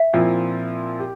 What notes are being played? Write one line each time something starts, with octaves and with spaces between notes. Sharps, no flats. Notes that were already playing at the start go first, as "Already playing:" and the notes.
Already playing: E5
A#2 F3 C4 E4
G4